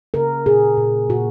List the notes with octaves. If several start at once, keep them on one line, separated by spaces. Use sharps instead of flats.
C#3 A#4
A#2 G#4
A#2
A#2 F#4